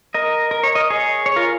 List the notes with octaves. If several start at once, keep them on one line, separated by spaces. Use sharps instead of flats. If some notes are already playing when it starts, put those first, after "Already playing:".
A#4 D#5
A#4
C#5
A#4 D#5
G#4 C#5
C#5
F4 A#4